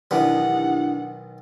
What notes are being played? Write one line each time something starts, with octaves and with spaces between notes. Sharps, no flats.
B1 D#3 E3 B3 D4 G4 F#5